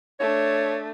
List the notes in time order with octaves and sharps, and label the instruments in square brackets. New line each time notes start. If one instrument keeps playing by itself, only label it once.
[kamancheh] A3 D4 [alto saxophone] C#5